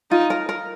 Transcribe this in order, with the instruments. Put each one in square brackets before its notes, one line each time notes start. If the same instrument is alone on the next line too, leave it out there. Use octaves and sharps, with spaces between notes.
[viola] D#4 [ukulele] F4
[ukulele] A#4
A#4